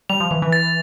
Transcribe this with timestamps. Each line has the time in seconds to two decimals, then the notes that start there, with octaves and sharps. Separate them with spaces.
0.09 G3 F7
0.20 F3
0.31 E3 F7
0.42 E3
0.53 A6